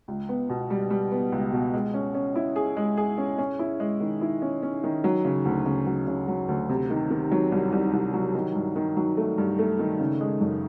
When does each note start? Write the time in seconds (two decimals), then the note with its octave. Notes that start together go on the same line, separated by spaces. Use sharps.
0.08 C#2
0.29 B3
0.50 B2
0.70 G3
0.90 G3
1.11 B3
1.32 C#2
1.53 B2
1.74 G#3
1.94 C#4
2.15 C#4
2.35 E4
2.56 G#4
2.77 G#3
2.97 G#4
3.18 C#4
3.38 C#4
3.59 E4
3.80 G#3
4.00 D#3
4.21 E4
4.42 C#4
4.63 C#4
4.84 D#3
5.04 F#3
5.25 C#3
5.45 D2
5.66 C#3
5.87 F#3
6.07 C#3
6.28 F#3
6.48 D2
6.69 C3
6.90 D#3
7.11 D#3
7.31 F#3
7.52 C2
7.72 C2
7.93 C2
8.14 F#3
8.34 D#3
8.55 G2
8.76 D#3
8.97 F#3
9.17 A3
9.38 G2
9.59 A3
9.79 D#3
10.00 C#3
10.21 G#3
10.41 F#2